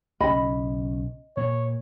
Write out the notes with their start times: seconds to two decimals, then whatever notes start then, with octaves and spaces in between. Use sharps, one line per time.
0.20 B1 C#3 C#4 D#5 B5
1.37 A#2 C#5